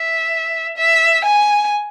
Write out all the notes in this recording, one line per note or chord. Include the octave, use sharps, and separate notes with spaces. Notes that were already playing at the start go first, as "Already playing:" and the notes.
Already playing: E5
E5
G#5